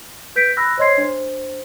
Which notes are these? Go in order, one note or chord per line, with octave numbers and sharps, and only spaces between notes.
B4 G6 B6 D7
B5 E6 F#6 A#6
C5 C#5 D#5 C6 G#6 C7
D4 C5